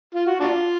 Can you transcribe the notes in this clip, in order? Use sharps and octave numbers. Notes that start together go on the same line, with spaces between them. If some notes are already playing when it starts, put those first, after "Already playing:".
F4
F#4
D4 F4